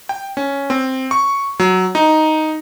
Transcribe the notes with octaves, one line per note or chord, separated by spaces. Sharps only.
G5
C#4
C4
C#6
F#3
D#4